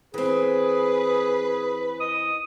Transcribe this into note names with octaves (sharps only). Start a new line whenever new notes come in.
E3 C4 G#4 B4
D#5 D#6